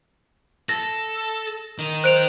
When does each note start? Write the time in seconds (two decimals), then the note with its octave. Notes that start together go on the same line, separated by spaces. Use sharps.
0.69 A4 A#6
1.79 D#3 D#4
2.04 C5 F#6 D7 F7